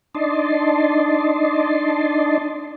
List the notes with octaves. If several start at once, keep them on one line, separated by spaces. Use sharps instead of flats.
D4 D#4 D5 D#5 A5 C6